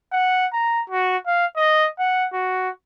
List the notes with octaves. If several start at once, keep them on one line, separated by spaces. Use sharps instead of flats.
F#5
A#5
F#4
F5
D#5
F#5
F#4